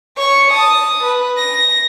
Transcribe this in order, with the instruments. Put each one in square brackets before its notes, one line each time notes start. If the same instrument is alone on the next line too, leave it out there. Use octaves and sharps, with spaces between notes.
[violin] C#5 C#6
A5 D#6
B4
A#6